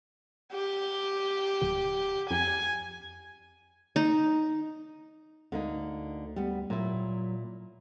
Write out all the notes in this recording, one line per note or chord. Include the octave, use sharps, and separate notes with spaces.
G4
D1
F2 G#5
D#4
D2 D3 A#3 D#4
G3 B3
A#2 F#3 E4